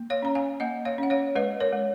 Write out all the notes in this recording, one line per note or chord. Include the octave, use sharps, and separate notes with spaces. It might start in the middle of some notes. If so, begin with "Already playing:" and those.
Already playing: A#3
C#5 F5
C#4 A#5
F5 G#5
A#3 D#5 F#5
C#5 F5
C#4 F#5
C#5 F5
G#3 B4 D#5
A#4 C#5
G#3